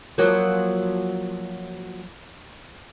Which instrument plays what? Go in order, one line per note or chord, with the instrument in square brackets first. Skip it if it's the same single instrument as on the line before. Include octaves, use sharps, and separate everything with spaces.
[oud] F3 F#3 A#3